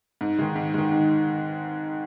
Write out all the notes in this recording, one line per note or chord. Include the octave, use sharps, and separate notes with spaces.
G#2
D#3 G#3
G#2
D#3 G#3
G#2